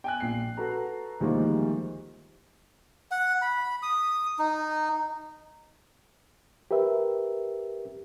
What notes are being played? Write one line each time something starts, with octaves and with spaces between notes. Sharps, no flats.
G5 G#5 F#6
A#1 C7
F#4 A4 B4 A#5
D2 D#3 F3 G3 G#3 A#3
F#5
B5
D#6
D#4
G4 A#4 B4 E5